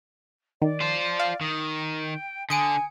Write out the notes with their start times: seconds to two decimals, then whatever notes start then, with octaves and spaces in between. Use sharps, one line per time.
0.62 D#3 D5
0.81 F4 C5
1.20 F5
1.41 D#3 D#6
1.79 G5
2.50 D3 G#5 D#6 C#7 D7